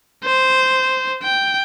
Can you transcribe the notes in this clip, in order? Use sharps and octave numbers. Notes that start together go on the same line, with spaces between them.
C5
G5